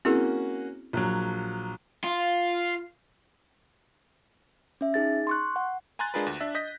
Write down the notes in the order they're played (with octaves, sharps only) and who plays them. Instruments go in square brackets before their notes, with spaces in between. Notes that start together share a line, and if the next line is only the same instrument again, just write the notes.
[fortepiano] A#3 C#4 F#4 [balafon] C4 E4 G#4
[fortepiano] A#1 F#3
[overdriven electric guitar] F4
[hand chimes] C#4 E5
D#4 G#4 A6
C6 C#6 F#6
F#5
[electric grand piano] G#5 A#5 C6 F#6 A6
G#3 D4 F4 G#4 A#4 B4
D2
D4 E5
D#5 G6 A#6 B6